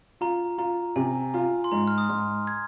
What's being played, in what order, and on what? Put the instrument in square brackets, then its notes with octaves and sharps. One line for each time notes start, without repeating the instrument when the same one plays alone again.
[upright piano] F4 [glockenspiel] A#5
[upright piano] F4 [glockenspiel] A#5
[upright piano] C3 [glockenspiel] G#5
[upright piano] F4 [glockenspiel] A#5
[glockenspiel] C6
[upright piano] G#2 [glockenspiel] A#5
[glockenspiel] F6
D#6
[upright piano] G#2 [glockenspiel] C6
[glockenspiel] G#6